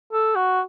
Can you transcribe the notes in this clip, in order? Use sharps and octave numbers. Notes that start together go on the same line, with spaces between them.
A4
F#4